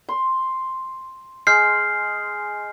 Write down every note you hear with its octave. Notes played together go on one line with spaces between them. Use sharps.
C6
G#3 F6 G6 C7